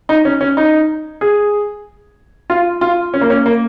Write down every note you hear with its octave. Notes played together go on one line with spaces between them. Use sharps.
D#4
C#4
C#4
D#4
G#4
F4
F4
C#4
A#3
C#4
A#3